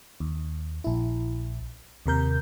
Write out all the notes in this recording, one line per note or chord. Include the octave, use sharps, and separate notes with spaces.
D#2
A#1 E4
D#2 C3 A#4 G6